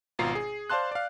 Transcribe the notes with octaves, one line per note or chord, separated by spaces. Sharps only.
G#1 B2 F4 A#5 C7
G#4
C5 D5 F5 A5 C6 F#6
D5 F5